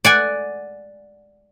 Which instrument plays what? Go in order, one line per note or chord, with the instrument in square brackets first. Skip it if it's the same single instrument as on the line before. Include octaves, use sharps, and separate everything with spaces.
[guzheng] D5 F#5 G#5